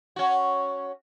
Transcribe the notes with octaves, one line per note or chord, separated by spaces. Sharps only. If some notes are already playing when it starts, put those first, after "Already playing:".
C#4 F#4